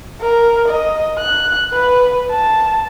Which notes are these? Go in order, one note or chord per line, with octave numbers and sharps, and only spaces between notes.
A#4
D#5
F#6
B4
A5